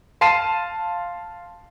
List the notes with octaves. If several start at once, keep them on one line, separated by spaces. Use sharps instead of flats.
F5 A5 C6 C7 D#7 E7